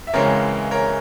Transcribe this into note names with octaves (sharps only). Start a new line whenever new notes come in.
E5
C#2 C#3 E3 G#3 C4 A#4 C#5
A#4 C#5